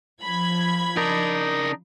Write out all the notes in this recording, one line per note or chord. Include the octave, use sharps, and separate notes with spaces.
F3 B5 G#6
C#3 D4 D#4 A#4